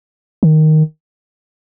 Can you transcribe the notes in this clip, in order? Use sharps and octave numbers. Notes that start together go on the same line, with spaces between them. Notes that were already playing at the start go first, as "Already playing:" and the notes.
D#3